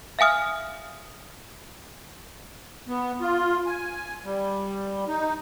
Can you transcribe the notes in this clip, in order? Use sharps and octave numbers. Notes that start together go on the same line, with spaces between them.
E5 F5 G#5 D#6 F6
B3
F4
G#5
G3
D#4